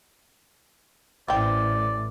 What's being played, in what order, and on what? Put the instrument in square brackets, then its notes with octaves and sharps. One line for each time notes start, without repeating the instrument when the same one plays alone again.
[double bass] A1 A2 [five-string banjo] C4 G5 [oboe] D5